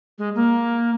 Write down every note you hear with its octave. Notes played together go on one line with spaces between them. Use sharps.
G#3
A#3